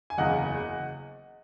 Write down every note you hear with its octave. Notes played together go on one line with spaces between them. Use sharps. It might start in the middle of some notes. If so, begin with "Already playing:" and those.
G#5
F#1 E2 C#3 D#5 F#5